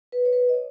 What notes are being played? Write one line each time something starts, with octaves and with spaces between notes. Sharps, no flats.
B4
C#5
B4
D#5
C#5